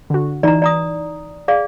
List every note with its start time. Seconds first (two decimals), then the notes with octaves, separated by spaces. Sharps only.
0.10 D3 F#4
0.43 E3 D#4 D5 A#5
0.62 D5 A#5 D#6
1.48 G#4 D5 F5